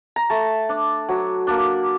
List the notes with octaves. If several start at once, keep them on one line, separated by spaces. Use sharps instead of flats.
A#5
A3 A5
D4
F#3
A#3 D4